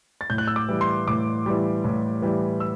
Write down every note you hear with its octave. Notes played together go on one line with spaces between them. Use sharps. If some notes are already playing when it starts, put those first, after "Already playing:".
A6
A2 G6
F#6
E6
D6
E3 G3
C6
A2 D6
E3 G3
A2
E3 G3
E6